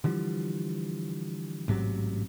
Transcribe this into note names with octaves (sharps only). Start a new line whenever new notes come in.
D3 E3 F3 G3
A1 G#2 C3 F#3